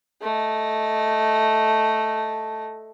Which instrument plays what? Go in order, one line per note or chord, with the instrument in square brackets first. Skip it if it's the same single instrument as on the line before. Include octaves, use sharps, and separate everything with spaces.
[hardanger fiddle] A3 D#5